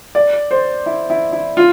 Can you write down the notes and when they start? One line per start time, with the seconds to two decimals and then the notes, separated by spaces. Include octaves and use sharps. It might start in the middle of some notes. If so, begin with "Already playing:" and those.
0.15 D5
0.51 C5
0.86 E4
1.10 E4
1.32 E4
1.57 F4